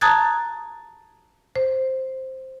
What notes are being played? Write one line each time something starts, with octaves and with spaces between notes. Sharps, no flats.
A5 A#5 D#6 F#6 G#6 A6
C5